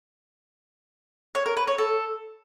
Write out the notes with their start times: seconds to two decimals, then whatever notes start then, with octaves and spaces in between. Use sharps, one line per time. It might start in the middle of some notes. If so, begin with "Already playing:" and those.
1.35 C#5
1.46 A#4
1.57 B4
1.67 C#5
1.78 A4